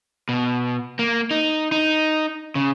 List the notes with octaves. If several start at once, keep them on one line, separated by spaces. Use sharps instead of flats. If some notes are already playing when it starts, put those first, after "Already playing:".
B2
A#3
D#4
D#4
C#3